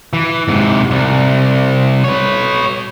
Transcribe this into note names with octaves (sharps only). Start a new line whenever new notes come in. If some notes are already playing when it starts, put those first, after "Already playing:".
E3
G#2 C3
C2
B4 C#5